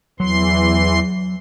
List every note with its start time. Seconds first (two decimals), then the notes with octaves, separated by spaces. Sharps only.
0.20 E2 E3 F#3 C6